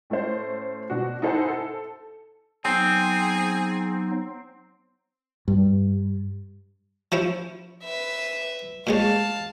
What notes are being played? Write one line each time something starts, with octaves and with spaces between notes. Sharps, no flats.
A2 A3 C#4 C5
B2 D4 F#4
D#4 E4 A4 C5 F#5 G#5
A4
F#3 B3 C4 D#4 G#4
G2
F3 C#4 E4
B4 E5
A#2 G#3 C#4 F5 A5